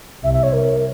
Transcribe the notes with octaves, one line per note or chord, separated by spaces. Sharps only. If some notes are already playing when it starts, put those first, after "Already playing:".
C2 C3 E5
E5
C#5
A#4